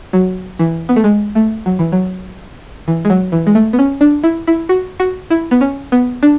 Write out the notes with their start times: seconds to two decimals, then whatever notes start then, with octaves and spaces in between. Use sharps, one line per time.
0.13 F#3
0.59 E3
0.89 B3
0.96 A3
1.04 G#3
1.35 A3
1.66 F#3
1.79 E3
1.92 F#3
2.88 E3
3.05 G#3
3.10 F#3
3.32 E3
3.47 G#3
3.55 A3
3.73 B3
3.79 C#4
4.01 D4
4.24 E4
4.47 E4
4.69 F#4
5.00 F#4
5.30 E4
5.51 B3
5.61 C#4
5.92 B3
6.23 D4